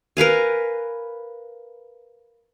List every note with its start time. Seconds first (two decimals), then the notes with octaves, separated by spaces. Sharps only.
0.17 A#4 B4 F5 G#5